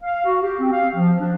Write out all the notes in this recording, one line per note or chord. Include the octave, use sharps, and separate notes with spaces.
F5
F#4
G4
C4
F5
F3
D4